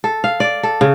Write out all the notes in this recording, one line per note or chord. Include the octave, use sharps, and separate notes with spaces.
A4
F5
D5
A4
C#3